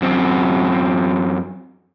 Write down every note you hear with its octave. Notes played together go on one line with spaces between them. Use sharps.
F#2 C4